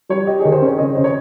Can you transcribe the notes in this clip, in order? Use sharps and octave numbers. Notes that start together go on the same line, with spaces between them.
G3 C#5
G4 D#5
G#4
D#3
C5
C#4 C#5
C#3 D#5
C#3 C5
C#5